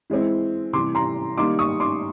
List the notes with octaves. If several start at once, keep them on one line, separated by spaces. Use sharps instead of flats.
E3 G#3 C4 E4
C3 E3 G3 C6 D6
A#5 C6
D#3 G3 A#3 D#4 C6 D6
C#6 D#6
C6 D6